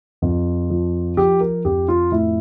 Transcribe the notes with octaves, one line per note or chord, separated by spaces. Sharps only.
F2
F3
F3 G4
A#4
F2 G4
F4
A2 E4